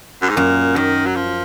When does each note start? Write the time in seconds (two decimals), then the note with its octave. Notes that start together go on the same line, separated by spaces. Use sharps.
0.22 F#2
0.29 G#2
0.36 F#2 A#2
0.76 F#2 D#3
1.06 F#3
1.16 F3